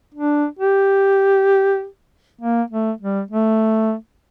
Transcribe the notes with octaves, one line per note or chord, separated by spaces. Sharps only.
D4
G4
A#3
A3
G3
A3